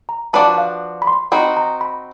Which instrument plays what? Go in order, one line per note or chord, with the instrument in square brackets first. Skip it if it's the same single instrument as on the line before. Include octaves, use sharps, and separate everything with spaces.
[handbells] A#5
[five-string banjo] F3 A3 D4 F#4 B4 [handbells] A5
[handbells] F5
B5
C6
[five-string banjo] C4 D#4 F#4 [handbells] B5
[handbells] A#5
B5